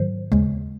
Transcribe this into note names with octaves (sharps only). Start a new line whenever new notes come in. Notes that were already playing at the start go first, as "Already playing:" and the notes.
Already playing: G#2 D#3 F#3 C5
D#2 C#3 G#3